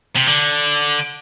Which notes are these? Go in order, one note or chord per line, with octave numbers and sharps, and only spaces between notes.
C3
D3